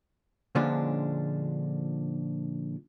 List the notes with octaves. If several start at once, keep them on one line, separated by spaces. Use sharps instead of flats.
A#2 D3 F3 G#3 C#4 D4